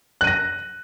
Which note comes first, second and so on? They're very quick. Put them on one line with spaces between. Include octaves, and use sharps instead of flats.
F#6 D#7 A#6